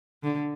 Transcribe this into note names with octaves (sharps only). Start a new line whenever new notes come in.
D3